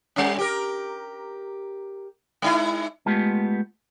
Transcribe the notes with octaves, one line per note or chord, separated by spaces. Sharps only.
G3 C#4
G4 A#4
G#3 D#4 E4
G#3 A3 B3 F4 G4